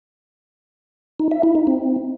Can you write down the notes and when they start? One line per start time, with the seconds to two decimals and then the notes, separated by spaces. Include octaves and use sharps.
1.20 D#4
1.31 E5
1.43 E4
1.55 D#4
1.67 C4